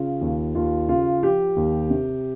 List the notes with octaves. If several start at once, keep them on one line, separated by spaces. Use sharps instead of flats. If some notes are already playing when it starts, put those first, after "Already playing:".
Already playing: C#3 F4
D#2
D#2 F4
C#3 F4
F3 G4
D#2
C3